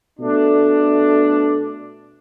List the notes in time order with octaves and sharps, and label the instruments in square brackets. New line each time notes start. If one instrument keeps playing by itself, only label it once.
[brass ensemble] B2 A3 D4